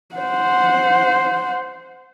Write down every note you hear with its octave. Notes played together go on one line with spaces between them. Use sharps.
C5 F#5